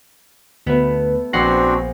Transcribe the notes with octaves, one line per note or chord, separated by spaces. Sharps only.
D2 A3 B3 B4
A#1 C4 D4 F#4 F#5 A#6 C7